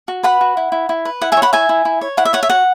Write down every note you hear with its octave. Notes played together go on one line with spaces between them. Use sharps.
F#4
B4 F#5 B5
F#4
E4
E4
E4
B4
E4 F#5
E5 G#5
C#5
F#5 B5
E4 E5 G#5
E4
E4
C#5
E4 F#5
E5
C#5 F#5
E5
F#4 F#5